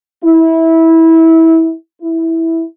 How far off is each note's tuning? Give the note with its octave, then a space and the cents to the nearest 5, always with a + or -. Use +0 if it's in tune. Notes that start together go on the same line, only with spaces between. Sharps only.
E4 -20
E4 -10